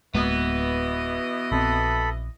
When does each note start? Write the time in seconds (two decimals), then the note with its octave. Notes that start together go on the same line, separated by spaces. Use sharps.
0.14 D1 B2 E3 G#3 A#3 B3 D#5
1.52 A#1 C4 A4 B5